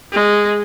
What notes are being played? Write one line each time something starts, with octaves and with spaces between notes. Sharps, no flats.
G#3